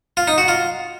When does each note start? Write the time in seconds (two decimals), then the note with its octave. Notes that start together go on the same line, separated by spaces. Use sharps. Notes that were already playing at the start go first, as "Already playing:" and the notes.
0.17 F4
0.27 D#4
0.38 F#4
0.48 F4